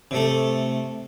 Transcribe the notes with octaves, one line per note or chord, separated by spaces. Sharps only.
C3 A3